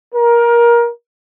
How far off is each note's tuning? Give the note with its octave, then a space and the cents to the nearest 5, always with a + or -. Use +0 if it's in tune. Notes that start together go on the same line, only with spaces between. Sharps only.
A#4 +20